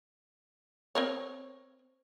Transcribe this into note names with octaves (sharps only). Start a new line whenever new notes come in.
C4 A#4 C#5